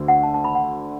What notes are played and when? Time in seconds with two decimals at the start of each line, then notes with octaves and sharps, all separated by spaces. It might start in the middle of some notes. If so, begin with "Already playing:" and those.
Already playing: D2 D3 A3 D4 F#4
0.08 F#5
0.23 A5
0.34 A5
0.44 B5
0.55 F#5